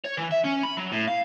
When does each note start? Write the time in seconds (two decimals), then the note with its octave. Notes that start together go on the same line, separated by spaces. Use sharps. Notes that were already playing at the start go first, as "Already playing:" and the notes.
0.04 C#5
0.17 E3
0.31 E5
0.44 C#4
0.63 B5
0.77 F#3
0.92 A2
1.08 F5